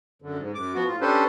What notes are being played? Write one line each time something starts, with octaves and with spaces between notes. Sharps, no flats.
F#2 D3
G#2
F#2 D6
F3 B3 F#4
A2 F4
C#4 D4 G4 A4 B4 C5